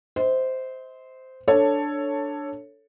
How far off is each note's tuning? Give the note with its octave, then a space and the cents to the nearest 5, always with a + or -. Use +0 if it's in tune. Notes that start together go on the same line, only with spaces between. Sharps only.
C5 -10 D#5 +45
D4 +0 A4 +10 C#5 +0